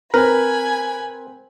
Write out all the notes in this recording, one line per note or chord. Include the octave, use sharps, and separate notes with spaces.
C4 A#4 B4 G#5 B5